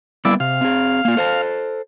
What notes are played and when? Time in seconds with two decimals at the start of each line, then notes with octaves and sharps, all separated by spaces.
0.25 G3 A#3 B3 E4 D5
0.40 C3 F5
0.61 C4 G#4
1.05 A#3 F4
1.17 A4 C5 A5